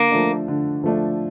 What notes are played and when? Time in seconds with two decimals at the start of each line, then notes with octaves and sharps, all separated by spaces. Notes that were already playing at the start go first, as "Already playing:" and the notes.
Already playing: D3 A#3
0.11 F3 A3 D4
0.48 D3
0.84 F3 A3 D4